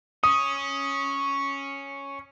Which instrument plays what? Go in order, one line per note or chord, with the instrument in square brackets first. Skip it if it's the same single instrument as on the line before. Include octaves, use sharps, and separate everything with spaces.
[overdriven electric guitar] C#4 [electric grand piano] D#6